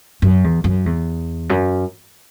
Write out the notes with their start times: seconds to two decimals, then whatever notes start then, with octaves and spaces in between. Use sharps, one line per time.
0.22 F#2
0.44 E2
0.64 F#2
0.86 E2
1.49 F#2